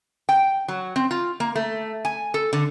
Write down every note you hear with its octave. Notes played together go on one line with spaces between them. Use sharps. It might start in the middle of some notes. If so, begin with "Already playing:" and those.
G5
F#3
C4
F4
A#3
A3
G#5
A4
D3